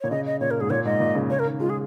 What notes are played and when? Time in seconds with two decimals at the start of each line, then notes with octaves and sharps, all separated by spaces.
0.01 A#2 C#5
0.11 C#3 D#5
0.26 D#5
0.40 A#2 C#5
0.51 A#4
0.60 G#2 G#4
0.70 A#2 C#5
0.85 G#2 D#5
1.00 A#2
1.15 C#3
1.30 C#3 C#5
1.39 A#4
1.45 D#3
1.60 G#3 F4
1.70 G#4